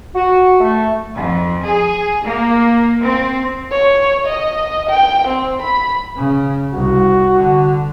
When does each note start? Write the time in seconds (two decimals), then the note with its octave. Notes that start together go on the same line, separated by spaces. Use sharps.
0.14 F#4
0.60 A3
1.15 F2
1.64 G#4
2.24 A#3
3.03 C4
3.71 C#5
4.26 D#5
4.89 G5
5.28 C4
5.62 B5
6.17 C#3
6.75 C2 F#4
7.36 D3